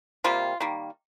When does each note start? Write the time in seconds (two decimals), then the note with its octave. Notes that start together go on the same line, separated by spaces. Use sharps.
0.24 C3 G3 A#3 F4
0.60 D#3 G3 A#3